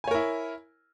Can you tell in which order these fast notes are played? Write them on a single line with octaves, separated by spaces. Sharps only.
G#5 C#5 A#4 E4